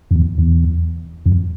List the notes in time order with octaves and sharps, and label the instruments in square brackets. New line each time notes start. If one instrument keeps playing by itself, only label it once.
[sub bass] F2
E2
E2
F2